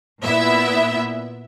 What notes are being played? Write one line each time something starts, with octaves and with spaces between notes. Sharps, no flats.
A#2 B3 E4 E5